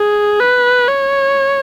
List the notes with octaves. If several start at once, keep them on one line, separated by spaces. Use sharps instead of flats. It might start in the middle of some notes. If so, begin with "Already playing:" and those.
Already playing: G#4
B4
C#5